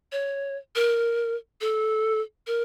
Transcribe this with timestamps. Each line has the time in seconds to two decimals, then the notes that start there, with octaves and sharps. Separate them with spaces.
0.12 C#5
0.76 A#4
1.61 A4
2.47 A#4